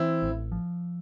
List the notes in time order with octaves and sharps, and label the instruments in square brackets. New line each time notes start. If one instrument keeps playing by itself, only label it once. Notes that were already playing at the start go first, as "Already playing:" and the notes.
Already playing: [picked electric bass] E3 [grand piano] C4 E4
[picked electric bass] A1
F3